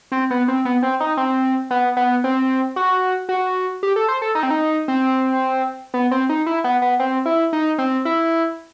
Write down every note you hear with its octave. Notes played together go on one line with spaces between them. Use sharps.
C4
B3
C4
B3
C4
D#4
C4
B3
B3
C4
F#4
F#4
G4
A4
C5
A4
D#4
C4
D#4
C4
B3
C4
D#4
E4
B3
B3
C4
E4
D#4
C4
E4